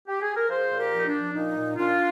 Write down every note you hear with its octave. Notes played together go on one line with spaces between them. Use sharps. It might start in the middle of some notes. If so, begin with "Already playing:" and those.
G4
G#4
A#4
F3 G#4 C5
A#2
G4 A#4
F3
D#4
D4
F3
A#2 D#4
A#2
A#2 D4 F4